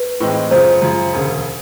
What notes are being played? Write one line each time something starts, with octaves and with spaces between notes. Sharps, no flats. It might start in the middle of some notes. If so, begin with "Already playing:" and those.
Already playing: B4
A2 E3 G#3 C4 D#4
F#2 C#3 F3 C5
F#2 C#3 F3
E1 D2 C#3